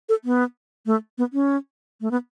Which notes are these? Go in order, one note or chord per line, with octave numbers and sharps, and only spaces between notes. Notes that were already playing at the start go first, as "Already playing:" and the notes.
A4
B3
A3
B3
C#4
A3
B3